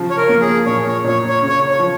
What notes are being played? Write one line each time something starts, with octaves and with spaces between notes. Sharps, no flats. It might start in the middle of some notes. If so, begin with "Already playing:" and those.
Already playing: C#3 F3
C#5
A#4
A#3
G#4
A#2 C#5
C#5
A#2 C#5
C#5
C#3
C#5
C#5
F3